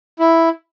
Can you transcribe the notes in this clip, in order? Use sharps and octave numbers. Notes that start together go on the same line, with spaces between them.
E4